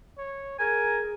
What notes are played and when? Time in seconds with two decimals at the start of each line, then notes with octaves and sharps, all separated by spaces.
0.18 C#5
0.59 G#4 A#4 G#5